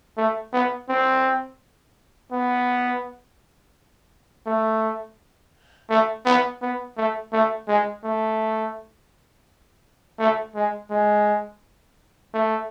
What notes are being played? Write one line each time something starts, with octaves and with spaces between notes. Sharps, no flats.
A3
B3
C4
B3
A3
A3
B3
B3
A3
A3
G#3
A3
A3
G#3
G#3
A3